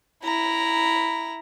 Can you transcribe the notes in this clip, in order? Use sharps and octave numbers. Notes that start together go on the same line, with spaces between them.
E4 A#5